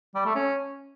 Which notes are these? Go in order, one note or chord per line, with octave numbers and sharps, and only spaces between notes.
G3
A3
C#4